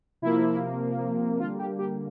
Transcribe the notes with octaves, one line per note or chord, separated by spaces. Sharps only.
C3 F3 A#3 E4
D3 G3 A#3 F4
G4
G4